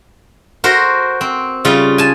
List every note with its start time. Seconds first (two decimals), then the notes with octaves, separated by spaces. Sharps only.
0.64 F#4 A#4 C5
1.21 C4
1.65 C#3 G3 F4
1.98 G#5 A5